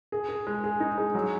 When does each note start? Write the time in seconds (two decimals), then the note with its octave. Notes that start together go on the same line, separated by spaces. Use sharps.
0.12 G#4
0.29 G#4
0.47 G#3
0.64 G#4
0.80 D#4
0.98 G#3
1.15 F#3